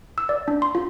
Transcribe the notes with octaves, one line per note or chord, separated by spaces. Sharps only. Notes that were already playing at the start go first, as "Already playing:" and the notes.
E6
D5
D4
C6
F4